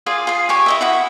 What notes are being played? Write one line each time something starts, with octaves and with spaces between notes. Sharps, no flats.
F4 G#4 D5 G#5
F4 G#4
G4 G#5 C#6
E4 D#5 E5
E4 F#4 E5